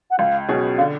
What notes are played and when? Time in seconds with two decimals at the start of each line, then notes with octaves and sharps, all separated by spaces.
0.11 F#5
0.19 C#2 F5
0.48 B2 F#3 C#4 G#4
0.78 D3 F5